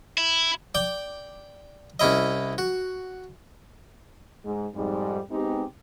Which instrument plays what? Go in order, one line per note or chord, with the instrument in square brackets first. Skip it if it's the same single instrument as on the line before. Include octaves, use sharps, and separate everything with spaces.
[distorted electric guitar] E4
[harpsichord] D5 G5 D6
C2 C#4 E4 D#5
F#4
[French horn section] G#2
F2 G#2 G3
G#3 B3 C4 D#4 G4